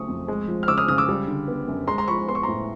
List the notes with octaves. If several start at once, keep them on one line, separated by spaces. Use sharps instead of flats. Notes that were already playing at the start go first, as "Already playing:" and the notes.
Already playing: C#3 F#3 A3 C#6 D#6
F2
G#3
F3
F6
C#3 D6 E6
D#6 F6
C#3 D#6 F6
D6 E6
G3
D3
B3
F#2
G#3 A#5 C6
A#5 C6
F3 B5 C#6
B3 C6
C#6
A2 A#5 C6